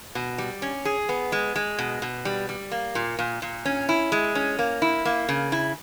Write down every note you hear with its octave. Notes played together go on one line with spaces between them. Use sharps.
B2
G3
C#4
G#4
B3
G#3
G#3
B2
B2
G3
G3
A#3
A#2
A#2
A#2
C#4
E4
G#3
C#4
A#3
E4
A#3
C#3
E4